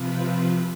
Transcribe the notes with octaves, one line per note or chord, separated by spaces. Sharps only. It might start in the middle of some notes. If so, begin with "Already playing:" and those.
Already playing: C3 F3 C4 F4 B4